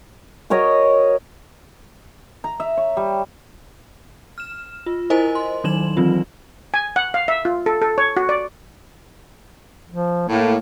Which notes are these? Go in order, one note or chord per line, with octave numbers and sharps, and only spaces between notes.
F#4 A#4 C#5 D#5
A#5
E5
C#5
G3
F6 E7
F4
E4 A#4 C5 D#5 G#5
C6
D#3 F#3 D#4 E7 F#7
D#3 E3 F#3 C4 F4
G#5
F#5
F5
E5
F4
A4
A4
C#5
F#4
D5
F3
A2 A#3